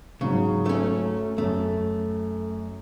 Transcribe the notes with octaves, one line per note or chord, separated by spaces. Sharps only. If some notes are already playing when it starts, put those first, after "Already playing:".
G#2 C#3 F#3
A3 C#4
F#2 A3